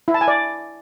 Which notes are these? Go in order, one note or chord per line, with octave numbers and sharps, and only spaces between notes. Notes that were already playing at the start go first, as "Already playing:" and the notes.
E4
A5
G#5
D5